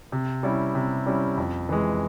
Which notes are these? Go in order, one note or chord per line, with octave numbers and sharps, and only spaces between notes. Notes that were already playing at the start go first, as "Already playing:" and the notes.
C3
G3 C#4 E4
C3
G3 C#4 E4
F2
E3 G#3